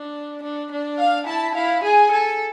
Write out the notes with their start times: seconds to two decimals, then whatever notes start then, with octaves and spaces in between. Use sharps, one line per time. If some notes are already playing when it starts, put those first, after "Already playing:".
Already playing: D4
0.43 D4
0.71 D4
0.99 F5
1.27 E4 A5
1.55 E4 F5
1.84 G#4 G#5
2.11 A4